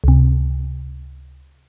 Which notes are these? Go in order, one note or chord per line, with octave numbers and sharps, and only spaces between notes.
C#2 C3